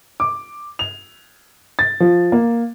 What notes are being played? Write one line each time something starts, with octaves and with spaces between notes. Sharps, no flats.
D6
F7
A6
F3
A#3